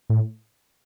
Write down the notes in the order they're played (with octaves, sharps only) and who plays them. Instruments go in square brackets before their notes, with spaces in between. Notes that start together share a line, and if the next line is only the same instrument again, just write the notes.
[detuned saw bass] A2